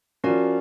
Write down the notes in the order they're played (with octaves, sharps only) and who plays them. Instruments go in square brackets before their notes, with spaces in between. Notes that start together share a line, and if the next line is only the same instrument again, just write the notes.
[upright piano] F3 [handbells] C#4 F#4 A#4 D5